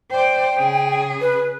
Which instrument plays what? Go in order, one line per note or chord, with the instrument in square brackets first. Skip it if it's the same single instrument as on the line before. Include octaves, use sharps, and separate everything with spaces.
[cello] C5 D5 [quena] G5
[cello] C#3 G#4
[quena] B4